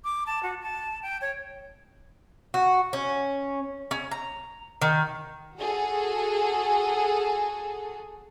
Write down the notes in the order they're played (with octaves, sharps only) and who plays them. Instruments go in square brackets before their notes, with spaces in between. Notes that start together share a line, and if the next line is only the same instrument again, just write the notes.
[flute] D6
A5
F#4
A5
G5
C#5
[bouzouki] F#4
C#4
C#4
A#5
D#3
[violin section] F#4 G#4 A4